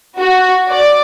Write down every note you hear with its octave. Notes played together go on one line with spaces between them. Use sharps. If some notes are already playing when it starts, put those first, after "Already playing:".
F#4
D5